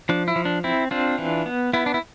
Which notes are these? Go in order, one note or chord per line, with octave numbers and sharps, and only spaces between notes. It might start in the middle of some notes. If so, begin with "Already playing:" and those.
F3 D4
E4
F3
D4
C4 E4
C4 D4 F4
E3
B3
B3 E4
D4
E4